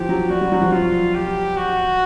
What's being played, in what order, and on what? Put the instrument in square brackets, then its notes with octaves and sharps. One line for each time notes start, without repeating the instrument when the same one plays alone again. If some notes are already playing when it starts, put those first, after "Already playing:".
Already playing: [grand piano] E3 F3 [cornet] G4
[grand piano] F#3
[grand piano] G3 [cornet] F#4
[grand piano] G3
F#3
F3
[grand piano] F#3 [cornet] F4
[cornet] G4
F#4